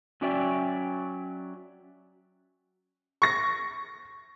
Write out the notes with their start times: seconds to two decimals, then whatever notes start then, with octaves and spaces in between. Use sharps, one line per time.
0.21 F#3 C#4 F#4 D5 E5 G5
3.22 C#6 A#6